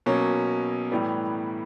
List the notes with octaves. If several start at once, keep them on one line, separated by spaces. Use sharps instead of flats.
B2 F#3 A#3 C#4
A2 E3 G3 B3